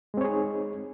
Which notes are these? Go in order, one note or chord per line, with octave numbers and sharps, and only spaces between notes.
G#3 C4 D#4 G#4 C#5